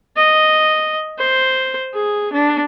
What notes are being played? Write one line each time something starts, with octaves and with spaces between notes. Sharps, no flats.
D#5
C5
G#4
D4